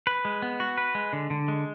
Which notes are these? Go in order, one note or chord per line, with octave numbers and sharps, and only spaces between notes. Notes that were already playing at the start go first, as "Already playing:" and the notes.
B4
G#3
B3
F#4
B4
G#3
D3
D3
G#3